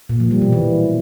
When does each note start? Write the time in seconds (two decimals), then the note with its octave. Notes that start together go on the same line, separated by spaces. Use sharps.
0.09 A#2
0.20 F3
0.31 G3
0.42 B2
0.52 E3